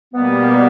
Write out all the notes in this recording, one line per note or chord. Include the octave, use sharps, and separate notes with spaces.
B2 G3 A#3 B3